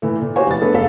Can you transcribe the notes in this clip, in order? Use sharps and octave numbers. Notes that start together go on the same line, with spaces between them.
A#2 E3 A3
A#2
F#4 G4 C5 C#5 G#5 C#6
F1 E3 A6
A3 B3 D4 A4 B4
F#1 F#2 A4 F5 B6